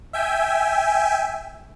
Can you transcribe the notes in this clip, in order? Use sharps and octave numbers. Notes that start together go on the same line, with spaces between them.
E5 G5 G#5